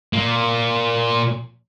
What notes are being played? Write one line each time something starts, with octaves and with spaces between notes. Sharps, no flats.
A#2 A#3